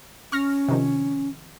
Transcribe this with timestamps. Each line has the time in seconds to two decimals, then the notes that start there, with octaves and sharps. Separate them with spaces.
0.32 C#4 C#6 F6 A#6
0.69 C3 D#3 F3